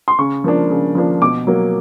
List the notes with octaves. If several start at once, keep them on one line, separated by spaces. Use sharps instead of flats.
C6
C#3 C#6
F3 A#3 D4
C#3
F3 A#3 D4
B2 D6
F#3 A#3